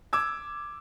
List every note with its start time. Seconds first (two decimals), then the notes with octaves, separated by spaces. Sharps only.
0.13 D6 E6 G#6